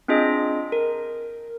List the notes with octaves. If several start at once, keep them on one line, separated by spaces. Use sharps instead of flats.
C4 D4 F4 G#4 D#5
A#4